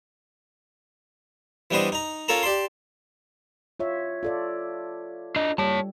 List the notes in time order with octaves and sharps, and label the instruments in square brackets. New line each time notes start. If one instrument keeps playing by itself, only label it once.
[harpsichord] E3 G3 B3 D4 C5 D#5
D#4 A#5
C#4 F4 A4 A#4 A5 A#5
G4 D5 A5 C6
[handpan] F4 C#5 E5
F4 A4 D5
[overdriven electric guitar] D4 D#5
[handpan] G3 [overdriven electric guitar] C#5 A5